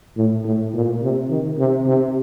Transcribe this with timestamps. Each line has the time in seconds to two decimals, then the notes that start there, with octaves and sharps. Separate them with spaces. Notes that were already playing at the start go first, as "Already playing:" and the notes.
0.17 A2
0.45 A2
0.73 A#2
1.02 C3
1.30 D#3
1.58 C3
1.86 C3